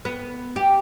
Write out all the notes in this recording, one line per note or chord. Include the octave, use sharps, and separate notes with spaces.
B3
G4